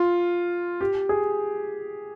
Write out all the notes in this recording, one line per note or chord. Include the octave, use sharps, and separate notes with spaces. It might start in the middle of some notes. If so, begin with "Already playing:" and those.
Already playing: F4
G4
G#4